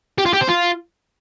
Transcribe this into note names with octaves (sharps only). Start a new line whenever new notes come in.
G4
F4
G4
C5
F4